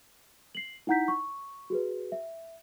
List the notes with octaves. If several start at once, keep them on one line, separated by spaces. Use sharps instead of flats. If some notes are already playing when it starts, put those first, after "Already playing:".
C7 F#7
D#4 E4 F#5 A#5 G6 B6
C#6
F#4 G#4 B4
E5